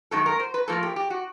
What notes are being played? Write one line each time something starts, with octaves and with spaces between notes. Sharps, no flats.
F#2 D#3 G#3 A4
A#4
C5
B4
A2 F3 A#3 A4
G4
G4
F#4